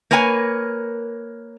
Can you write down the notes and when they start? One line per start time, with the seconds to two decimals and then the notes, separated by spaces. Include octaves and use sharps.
0.11 A#3 A#4 B4 C#5 G#5